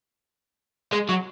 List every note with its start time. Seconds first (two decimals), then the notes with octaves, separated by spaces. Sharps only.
0.92 G#3
1.09 F#3